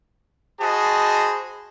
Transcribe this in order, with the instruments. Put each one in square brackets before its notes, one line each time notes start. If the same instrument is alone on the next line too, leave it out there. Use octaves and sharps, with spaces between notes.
[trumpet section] F#4 G#4 C5 D#5 A5 B5